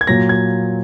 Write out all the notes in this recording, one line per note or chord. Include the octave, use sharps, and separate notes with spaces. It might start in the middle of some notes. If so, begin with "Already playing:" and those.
G#6
A#2 F#3 A#6
G#6